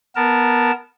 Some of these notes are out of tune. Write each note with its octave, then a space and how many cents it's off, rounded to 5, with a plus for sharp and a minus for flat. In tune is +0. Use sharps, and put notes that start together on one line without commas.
B3 -10 A#4 +0 A5 +0